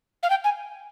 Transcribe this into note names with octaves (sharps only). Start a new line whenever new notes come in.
F5
G5
G#5